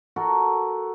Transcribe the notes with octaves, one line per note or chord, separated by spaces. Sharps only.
F#4 A4 A#4